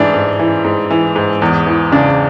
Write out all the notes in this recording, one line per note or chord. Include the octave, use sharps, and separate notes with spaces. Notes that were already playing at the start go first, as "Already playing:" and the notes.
Already playing: G#2 E3 D4 E4
G#2
E3
G#2
E3
G#2
E2
E3
C#3 D4